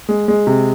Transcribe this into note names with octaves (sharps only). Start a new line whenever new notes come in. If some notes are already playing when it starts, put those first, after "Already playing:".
G#3
G#3
C3